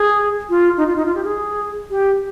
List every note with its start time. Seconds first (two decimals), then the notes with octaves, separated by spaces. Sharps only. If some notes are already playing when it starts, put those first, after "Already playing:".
Already playing: G#4
0.50 F4
0.77 D#4
0.87 F4
0.96 D#4
1.06 F4
1.15 G4
1.24 G#4
1.90 G4